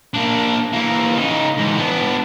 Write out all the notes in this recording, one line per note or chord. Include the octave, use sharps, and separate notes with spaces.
A#3 D4
E3 A#3
C#3 D#4
G#2 E3
B3 D4